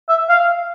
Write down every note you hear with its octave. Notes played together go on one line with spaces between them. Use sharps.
E5
F5